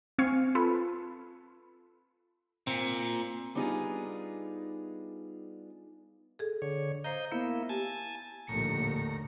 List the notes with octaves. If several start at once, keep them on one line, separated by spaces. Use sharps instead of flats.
C4 F5 G#5 C#6
F4 A4 B4
A#2 C4
G3 B3 D4 D#4 F4 G#4
G#4 A4
D3 C#5
C5 D#5 F5 A#5 G6
A#3 B3 E4
G4 G#5 A5
A#1 D#2 A2 D3 A#5 C#7